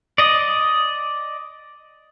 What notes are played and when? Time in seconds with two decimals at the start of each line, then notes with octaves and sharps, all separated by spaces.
0.18 D5 D#5